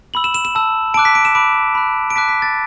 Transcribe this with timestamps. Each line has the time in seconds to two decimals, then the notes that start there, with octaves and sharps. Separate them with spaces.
0.14 B5 E6 F#7
0.24 E7
0.34 E7
0.45 E7
0.55 A5 E6
0.94 A5 D6 F#6 D7
1.05 B6
1.15 D7
1.25 E7
1.35 B5 D6 F#6 D7
1.75 B5 F#6
2.10 D7
2.16 A5 D6 F#6 B6
2.29 B6
2.42 A6